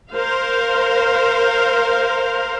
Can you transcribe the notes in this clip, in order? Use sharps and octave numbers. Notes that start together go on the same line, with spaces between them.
A#4 C5 F5